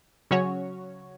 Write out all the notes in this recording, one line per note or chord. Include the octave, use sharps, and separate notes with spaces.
C#3 F#3 C#4 F#4 C#5